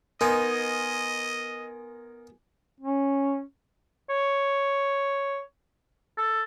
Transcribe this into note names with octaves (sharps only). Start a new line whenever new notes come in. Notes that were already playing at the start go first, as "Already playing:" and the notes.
B3 D#4 A#4 D#5 G#5 C6
C#4
C#5
A4